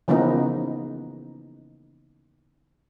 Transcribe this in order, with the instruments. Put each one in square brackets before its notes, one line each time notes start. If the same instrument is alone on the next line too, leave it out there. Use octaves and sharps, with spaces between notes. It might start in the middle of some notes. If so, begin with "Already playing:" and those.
[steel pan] C#3 E3 F3 A#3 B3 D#4